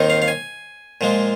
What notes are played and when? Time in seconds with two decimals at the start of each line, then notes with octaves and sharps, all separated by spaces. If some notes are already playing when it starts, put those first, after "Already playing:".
Already playing: D#2 D#3 C4 D#4
0.10 F5
0.22 F5
0.28 G#5
1.01 A#2 F3 G#3